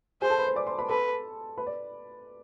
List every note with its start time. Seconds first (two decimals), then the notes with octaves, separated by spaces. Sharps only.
0.22 G#4 C5 G#5
0.30 A4 A5
0.39 B4 B5
0.47 C5 C6
0.56 D5 D6
0.67 C5 C6
0.78 B4 B5
0.89 A4 B4 A5
1.58 B4 B5
1.66 D5